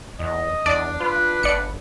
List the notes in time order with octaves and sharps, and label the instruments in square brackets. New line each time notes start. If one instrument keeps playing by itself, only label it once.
[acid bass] E2 [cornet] D#5
[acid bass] E2 [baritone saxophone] D4 [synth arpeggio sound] D5
[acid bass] F4 [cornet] B4
[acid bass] G1 [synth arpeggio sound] D5 C#7